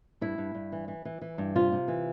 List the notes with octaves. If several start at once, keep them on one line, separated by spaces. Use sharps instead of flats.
G2 E4
G2
G2
E3
E3
E3
E3
G2
C3 F4
C3
E3